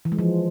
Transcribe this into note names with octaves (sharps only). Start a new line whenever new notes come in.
E3
G#3
F3